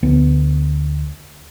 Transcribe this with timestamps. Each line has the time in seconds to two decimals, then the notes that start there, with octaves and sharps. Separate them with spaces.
0.03 D2 B3